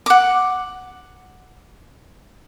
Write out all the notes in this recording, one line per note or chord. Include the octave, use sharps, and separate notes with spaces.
F#5 D6